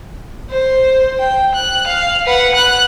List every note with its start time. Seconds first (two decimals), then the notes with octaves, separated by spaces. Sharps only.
0.51 C5
1.19 G5
1.55 F#6
1.87 F5
2.26 B4 F#5
2.56 F#6